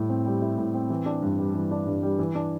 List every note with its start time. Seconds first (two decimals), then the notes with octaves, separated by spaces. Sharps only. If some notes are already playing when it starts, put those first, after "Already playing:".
Already playing: A2 G3 E4
0.09 C4
0.26 G3
0.42 E4
0.58 A2
0.74 C4
0.90 E3
1.06 D4
1.22 G2
1.38 G3
1.54 E3
1.71 D4
1.86 G2
2.03 G3
2.19 E3
2.35 D4